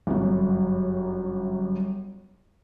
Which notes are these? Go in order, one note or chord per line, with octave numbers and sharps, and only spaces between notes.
G1 F#2 F#3